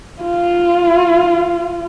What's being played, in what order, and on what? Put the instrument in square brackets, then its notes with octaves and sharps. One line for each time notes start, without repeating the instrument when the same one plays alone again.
[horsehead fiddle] F4